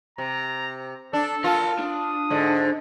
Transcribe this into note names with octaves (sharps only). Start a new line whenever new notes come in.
C3 A#5
D4 A4
F4 A#4 A5
D4 D#6
G#2 D3